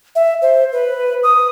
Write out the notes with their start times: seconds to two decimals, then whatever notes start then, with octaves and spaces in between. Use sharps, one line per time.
0.15 E5
0.42 C5
0.72 B4
1.23 D#6